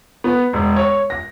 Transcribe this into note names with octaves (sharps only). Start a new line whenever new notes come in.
B3
E1
C#5
A#6